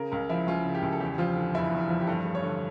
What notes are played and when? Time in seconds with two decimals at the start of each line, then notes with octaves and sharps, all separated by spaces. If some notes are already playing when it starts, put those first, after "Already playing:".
Already playing: C#3 A#4
0.12 C#2 A#4
0.30 F3 E4
0.47 C#2 F4
0.65 C#3
0.75 G4
0.82 C#2
0.92 A4
1.00 E2 G4
1.18 F3 F4
1.36 D3
1.54 F1 E4
1.72 E2
1.89 F3
2.00 G4
2.07 G2 A4
2.25 A3
2.35 C#5
2.43 D3